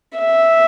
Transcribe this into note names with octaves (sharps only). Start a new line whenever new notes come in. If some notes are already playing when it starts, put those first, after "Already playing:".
E5